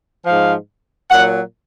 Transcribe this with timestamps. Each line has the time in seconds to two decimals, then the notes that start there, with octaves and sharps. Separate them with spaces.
0.24 G#2 F3 F5
1.09 A#2 F#3 F#5